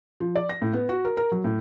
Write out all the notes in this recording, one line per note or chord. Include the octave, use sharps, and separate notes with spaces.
F3
D5
A#6
A2
B3
F#4
A#4
A#4
F#3
A2